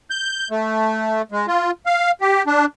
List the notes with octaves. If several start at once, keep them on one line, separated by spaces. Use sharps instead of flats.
G6
A3
G#3
F4
F5
G4
D4